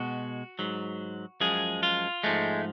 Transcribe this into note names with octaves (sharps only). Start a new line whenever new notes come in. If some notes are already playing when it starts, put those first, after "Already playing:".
Already playing: B2 G#3 F#4
G#2 F#3
F#2 F3 G#3 G#4
F4
G#2 F3 G#3 A3